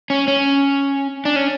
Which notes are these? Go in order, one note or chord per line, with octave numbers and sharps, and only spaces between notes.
C#4
C#4
D4
C#4